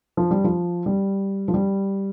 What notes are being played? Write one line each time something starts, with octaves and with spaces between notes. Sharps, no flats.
F3
G3
F3
G3
F3
G3